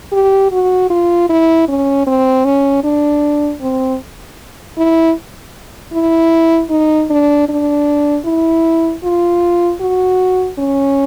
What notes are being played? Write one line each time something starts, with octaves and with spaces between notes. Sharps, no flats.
G4
F#4
F4
E4
C#4
C4
C#4
D4
C4
E4
E4
D#4
D4
D4
E4
F4
F#4
C#4